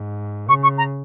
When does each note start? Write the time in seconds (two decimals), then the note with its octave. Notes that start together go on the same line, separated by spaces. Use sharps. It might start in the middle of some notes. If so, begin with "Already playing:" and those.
Already playing: G#2
0.49 C#3 C#6
0.63 C#6
0.78 A#5